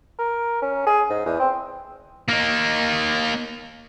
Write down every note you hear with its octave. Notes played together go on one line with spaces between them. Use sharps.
A#4
C#4
G#4
G#2
E2
C4
A#3 D#4